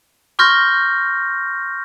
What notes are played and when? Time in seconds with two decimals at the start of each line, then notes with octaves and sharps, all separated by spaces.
0.39 C6 C#6 F6 G6 A#6